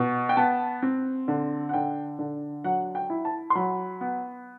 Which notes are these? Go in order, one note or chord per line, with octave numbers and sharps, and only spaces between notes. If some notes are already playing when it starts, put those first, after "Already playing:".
Already playing: B2
G5
B3 A5
C4
D3
F#5
D3 G5
D3
F#3 F#5
G5
E4
A5
C6
F#3 B5
B3